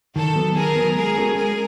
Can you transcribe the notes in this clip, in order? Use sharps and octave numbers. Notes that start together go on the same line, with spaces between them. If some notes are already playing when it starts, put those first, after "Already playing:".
D#3 A4
F#3 B3
D#3 G#4 A#4
F#3 B3
G#3 G#4 A#4
C#4 F#4 A4
G#3 G#4 A#4